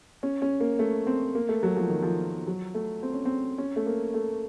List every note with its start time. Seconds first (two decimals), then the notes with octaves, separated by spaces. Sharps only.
0.23 C#4
0.42 C#4
0.60 A#3
0.79 A3
1.07 C4
1.35 A#3
1.49 A3
1.63 F#3
1.77 F3
1.89 D#3
2.03 F3
2.47 F#3
2.75 A3
3.03 C4
3.14 C#4
3.25 C4
3.58 C#4
3.76 A3
3.86 A#3
4.14 A3